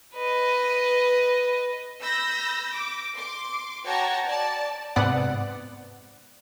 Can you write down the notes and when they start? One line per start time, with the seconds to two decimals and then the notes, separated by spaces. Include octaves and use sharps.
0.14 B4 D#5
2.00 B5 E6 G6 A#6
2.75 D6
3.14 C6 D6
3.84 F#4 C#5 G5 A5 A#5 G#6
4.25 D5 A5
4.96 G#2 C3 B3 D5 F#5